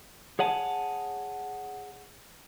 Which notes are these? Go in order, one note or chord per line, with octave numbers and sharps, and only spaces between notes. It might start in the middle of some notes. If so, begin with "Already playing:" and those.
G#4 C#5 F#5 G#5 A5